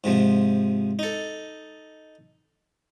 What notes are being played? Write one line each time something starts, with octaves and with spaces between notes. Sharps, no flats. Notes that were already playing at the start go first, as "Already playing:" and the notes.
G#2 C3 F3
D#4 A4